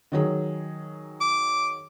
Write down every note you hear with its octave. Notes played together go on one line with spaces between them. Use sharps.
D#3 F#3 G#4
D6